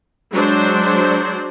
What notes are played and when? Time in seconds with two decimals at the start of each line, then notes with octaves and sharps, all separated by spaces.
0.31 F#3 G#3 D4 C5